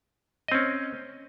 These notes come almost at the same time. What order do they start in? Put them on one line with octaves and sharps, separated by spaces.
D#5 C4 C#4